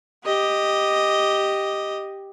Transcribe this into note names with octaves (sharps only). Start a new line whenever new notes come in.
G4 D#5